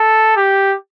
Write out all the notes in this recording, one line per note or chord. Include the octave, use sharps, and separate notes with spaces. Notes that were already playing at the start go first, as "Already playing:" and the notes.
Already playing: A4
G4